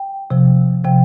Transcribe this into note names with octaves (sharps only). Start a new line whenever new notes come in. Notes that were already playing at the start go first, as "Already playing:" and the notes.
Already playing: G5
C3 F3
C3 F3 G5